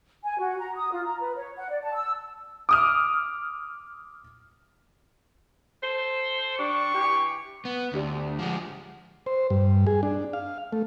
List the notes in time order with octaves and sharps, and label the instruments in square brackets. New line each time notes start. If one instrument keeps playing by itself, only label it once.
[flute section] G#5
F#4
A#5
D#6
F4
A#5
B4
C#5
F#5
D5
A5
E6
[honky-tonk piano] D6 D#6 F6
[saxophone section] A4 C5
[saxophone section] G3 D4 [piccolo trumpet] C#6
[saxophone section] E3 G4
[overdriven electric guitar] B3
[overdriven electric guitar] D2 [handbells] D4 G4 D5
[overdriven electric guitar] F3 G#3 [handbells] F#5 G#5 D6
[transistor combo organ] C5
G2
G#4
D4
F5
A3